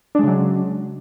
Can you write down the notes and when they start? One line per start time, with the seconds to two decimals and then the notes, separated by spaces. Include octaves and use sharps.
0.15 D4
0.19 G#3
0.23 C#3
0.28 F#3